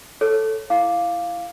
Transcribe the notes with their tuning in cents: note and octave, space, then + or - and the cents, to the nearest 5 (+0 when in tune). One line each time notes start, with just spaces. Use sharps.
A4 +0 C#5 +0
E4 +15 F5 +0 D6 +0